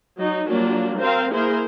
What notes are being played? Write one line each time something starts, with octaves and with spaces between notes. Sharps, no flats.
F#3 D#4
F#3 G3 A#3 D4 F4
C4 A#4 C5 F5
A#3 E4 G#4 A#4 C5